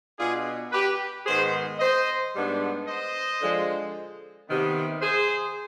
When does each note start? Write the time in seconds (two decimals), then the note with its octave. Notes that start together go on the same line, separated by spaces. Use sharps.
0.18 B2 B3 D4 F4 G#4
0.72 G4 B4
1.26 G#2 D#3 B3 G#4 C5
1.79 C5 D#5
2.34 G#2 G3 B3 D4
2.87 C5 D#5
3.40 D3 F3 G#3
4.48 C3 D#3 B3
5.02 G#4 C5